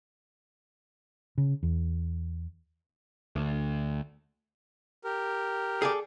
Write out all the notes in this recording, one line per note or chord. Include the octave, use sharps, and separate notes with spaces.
C#3
E2
D2
G4 A#4
G#4 A4 D5